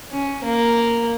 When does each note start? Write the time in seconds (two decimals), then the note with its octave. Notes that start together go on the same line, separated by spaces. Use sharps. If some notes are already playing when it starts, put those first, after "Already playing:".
0.12 C#4
0.44 A#3